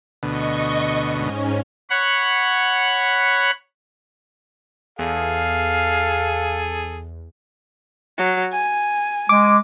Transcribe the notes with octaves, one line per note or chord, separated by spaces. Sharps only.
D2 B2 D#5 C#6
G#2 C#4
C#5 F#5 B5
E2 G#4 A4 F5
F#3
G#5
G#3 D6